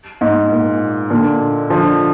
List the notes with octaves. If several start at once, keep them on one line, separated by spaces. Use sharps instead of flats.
G#2
A#2
A#2 D3
D3 F3